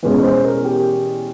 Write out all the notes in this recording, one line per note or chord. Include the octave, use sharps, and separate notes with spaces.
E2 B2 G#3 C#4 B4
C5
A#4
G4